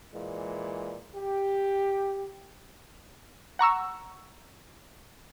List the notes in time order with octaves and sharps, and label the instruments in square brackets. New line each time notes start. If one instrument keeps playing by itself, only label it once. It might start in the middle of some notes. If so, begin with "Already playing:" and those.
[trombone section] A#2 E3 G#3
G4
[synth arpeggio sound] F#5 A#5 C#6 E6